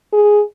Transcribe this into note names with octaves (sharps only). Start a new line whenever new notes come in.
G#4